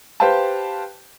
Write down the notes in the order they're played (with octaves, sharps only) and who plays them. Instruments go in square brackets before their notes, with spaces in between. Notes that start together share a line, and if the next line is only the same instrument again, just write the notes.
[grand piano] G4 B4 C5 F5 G5 A5